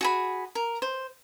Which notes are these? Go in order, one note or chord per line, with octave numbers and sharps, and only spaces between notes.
F#4 G#4 B5
A#4
C5